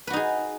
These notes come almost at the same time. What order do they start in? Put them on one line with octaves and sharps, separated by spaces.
B4 F#4 D#4 G#4